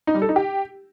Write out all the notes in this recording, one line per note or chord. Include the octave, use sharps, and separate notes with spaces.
D#4
G3
A4
D#4
G4